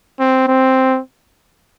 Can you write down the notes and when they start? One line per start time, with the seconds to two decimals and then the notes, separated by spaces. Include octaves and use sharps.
0.20 C4
0.48 C4